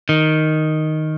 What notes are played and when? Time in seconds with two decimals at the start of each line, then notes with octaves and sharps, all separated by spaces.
0.09 D#3